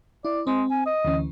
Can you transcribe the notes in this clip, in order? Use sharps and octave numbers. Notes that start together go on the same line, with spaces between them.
E4 D5
G#3 C4
G#5
D#5
D2 E3 C#4